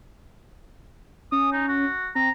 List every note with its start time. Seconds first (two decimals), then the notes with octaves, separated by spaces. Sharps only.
1.32 C#4 D#6
1.52 D#4
1.68 F#4
2.15 C4 A#5